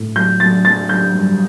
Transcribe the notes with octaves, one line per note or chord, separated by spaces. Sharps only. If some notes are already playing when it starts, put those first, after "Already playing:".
Already playing: A2
F#3 G6
F#3 A6
F#3 A6
F#3 G6
G2